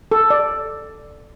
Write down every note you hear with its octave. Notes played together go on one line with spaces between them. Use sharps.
A4
D5